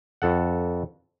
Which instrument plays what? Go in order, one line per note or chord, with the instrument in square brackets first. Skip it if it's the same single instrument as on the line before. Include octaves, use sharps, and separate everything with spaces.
[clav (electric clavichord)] F2 A4 F#5